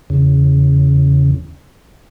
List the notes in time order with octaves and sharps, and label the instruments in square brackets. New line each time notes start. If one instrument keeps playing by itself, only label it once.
[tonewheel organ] E2 C#3